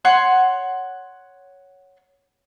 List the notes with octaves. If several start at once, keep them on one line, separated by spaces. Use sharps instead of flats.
C#5 F#5 C6